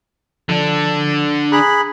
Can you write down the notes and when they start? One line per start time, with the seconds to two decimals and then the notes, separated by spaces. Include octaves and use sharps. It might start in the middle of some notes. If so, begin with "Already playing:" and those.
0.49 D3 F3 D4
1.52 G#4 A#5 B5 F#6